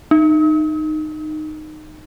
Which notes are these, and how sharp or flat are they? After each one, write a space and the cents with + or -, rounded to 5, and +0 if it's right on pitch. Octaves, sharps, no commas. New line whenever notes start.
D#4 -15